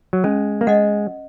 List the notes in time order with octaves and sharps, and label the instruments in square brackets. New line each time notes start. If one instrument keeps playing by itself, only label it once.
[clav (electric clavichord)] F#3
[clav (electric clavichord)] G#3 [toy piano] C#4
[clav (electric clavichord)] A#3
[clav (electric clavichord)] G#3 [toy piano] D#5 F#5